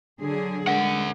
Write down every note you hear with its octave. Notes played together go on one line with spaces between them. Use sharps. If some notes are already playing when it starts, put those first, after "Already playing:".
D3 F#3 G#4
D3 G#3 A#4 F#5